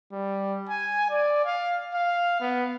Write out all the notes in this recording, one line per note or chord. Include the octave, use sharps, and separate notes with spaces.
G3
G#5
D5
F5
F5
B3